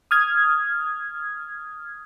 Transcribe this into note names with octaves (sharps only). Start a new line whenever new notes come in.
D#6 F6 G#6